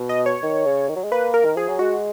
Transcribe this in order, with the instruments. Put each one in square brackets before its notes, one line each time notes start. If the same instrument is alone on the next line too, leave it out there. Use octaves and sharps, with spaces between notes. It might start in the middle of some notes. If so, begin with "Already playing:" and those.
Already playing: [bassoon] B2
[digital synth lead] D#5
C#5
[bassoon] D#3
C#3
D#3
F#3
G#3
[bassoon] A#3 [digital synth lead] B4
[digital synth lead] A#4
[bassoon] D#3
[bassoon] F3 [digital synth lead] G#4
[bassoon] F#3
[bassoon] G#3 [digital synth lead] F#4